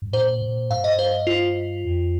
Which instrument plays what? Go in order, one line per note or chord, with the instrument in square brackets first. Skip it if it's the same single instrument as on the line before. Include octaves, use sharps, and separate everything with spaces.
[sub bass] G2
[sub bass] A#2 [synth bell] C5
[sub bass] A#2
[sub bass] G2 [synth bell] F5
[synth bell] D#5
C5
F4
[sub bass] F2